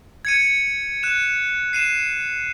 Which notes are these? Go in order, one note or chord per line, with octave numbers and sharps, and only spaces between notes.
G#6 C#7 D#7
F#6 E7
C7 D#7 E7